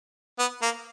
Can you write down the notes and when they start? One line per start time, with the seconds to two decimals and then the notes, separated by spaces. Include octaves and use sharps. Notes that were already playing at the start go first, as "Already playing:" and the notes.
0.39 B3
0.62 A#3